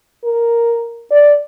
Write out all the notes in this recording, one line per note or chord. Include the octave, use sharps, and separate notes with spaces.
A#4
D5